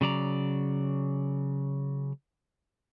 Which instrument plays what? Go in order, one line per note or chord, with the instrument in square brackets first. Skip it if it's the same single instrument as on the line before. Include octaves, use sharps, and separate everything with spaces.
[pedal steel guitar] C#3 F#3 D5 A#5